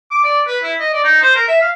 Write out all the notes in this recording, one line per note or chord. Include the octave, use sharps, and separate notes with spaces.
D6
D5
B4
E4
D#5
D5
D#4
C5
A#4
E5
F5